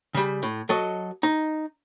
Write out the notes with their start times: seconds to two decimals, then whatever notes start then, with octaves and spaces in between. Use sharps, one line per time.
0.15 C#3 G3
0.43 A2
0.69 F#3 A4 D#5
1.23 D#4